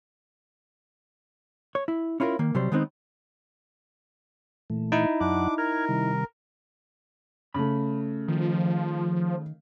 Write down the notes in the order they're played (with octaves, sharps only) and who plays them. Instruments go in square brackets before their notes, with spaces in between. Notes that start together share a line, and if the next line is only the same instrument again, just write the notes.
[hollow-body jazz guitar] C#5
E4
C#4 E4 F4 G4 A#4
D#3 A#3
C3 F#3 G3 C5
D#3 G#3 B3 C4 D4 D#4
[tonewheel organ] A#2 E3 A3
[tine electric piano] D#4 E4
[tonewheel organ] F#2 F#3 F#5 [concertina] D4 D6
[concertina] A#4 [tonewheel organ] F6 G#6
[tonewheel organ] C3 D#3 G3
[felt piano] C#3 A3 [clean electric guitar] B5
[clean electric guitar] D#3 [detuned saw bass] F3